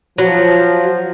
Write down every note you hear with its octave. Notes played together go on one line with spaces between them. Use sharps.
F3 F#3